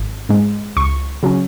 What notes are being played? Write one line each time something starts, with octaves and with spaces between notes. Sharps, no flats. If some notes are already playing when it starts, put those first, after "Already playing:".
Already playing: G#1
G#2 G#3
C#2 C#6
C#3 F#3 C#4